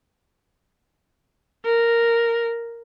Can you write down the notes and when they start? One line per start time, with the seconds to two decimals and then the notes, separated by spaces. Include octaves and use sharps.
1.65 A#4